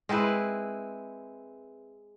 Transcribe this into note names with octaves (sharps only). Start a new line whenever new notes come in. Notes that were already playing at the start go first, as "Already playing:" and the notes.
G#3 C4 E4 B4